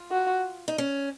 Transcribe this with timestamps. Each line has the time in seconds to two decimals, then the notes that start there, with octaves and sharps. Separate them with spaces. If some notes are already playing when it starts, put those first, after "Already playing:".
Already playing: F4
0.11 F#4
0.68 D#4
0.78 C#4